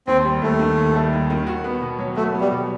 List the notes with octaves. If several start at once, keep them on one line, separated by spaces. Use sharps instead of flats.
D#2 C4
G3
D#2 A3
D#3
D#2
G3
D#2
D#3
F#4
B3
B2
F#3
A3 F#4
B3
G3
B2